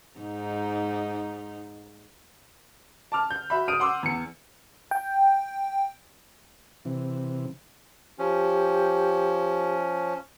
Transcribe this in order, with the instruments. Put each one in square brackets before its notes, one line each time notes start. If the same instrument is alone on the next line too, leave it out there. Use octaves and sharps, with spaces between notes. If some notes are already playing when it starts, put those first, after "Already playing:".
[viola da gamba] G#2 D#4
[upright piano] A5 D6 F6
G6
F#4 E5 B5
D#6 F6 D7 D#7
F#5 C6 D6 E6
E2 C#7
[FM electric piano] G5
[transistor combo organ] C3 E3
[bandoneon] F3 C#4 [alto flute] G4